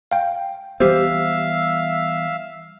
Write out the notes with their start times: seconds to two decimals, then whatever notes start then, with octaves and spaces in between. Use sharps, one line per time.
0.11 F5 G5
0.80 E3 G3 B3 G4 C5 E5 F5 E6